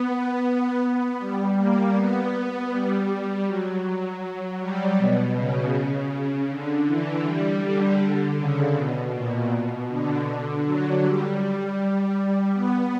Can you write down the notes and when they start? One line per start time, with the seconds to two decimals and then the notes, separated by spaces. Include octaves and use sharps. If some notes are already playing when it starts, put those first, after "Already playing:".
Already playing: B3
0.81 B3
1.19 G3
1.57 A#3
1.94 B3
2.32 B3
2.70 G3
3.45 F#3
4.59 G3
4.97 B2
5.34 C#3
6.48 D3
6.86 E3
7.23 G3
7.61 D3
8.36 C#3
8.74 B2
9.13 A#2
9.51 B2
9.88 D3
10.26 D3
10.64 F#3
11.01 G3
12.53 B3